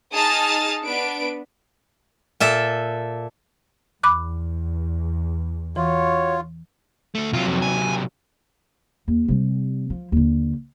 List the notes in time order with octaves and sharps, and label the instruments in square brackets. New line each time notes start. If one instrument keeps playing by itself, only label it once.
[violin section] D#4 G#4 A5 D#6 F6 A6
B3 D4 B4 D7
[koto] A#2 A4 E5
[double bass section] E2 [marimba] B5 D6 F#6
[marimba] E3 [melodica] F4 [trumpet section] F#4 C#5
[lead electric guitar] D2 A3
[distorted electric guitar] C3 F#3 [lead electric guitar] F4
[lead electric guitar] F2
G#5
[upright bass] D#2
C3 G3
F3
D#2 D3